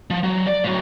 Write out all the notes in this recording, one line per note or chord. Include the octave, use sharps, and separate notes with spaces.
F3
F#3
D5
A2 F#3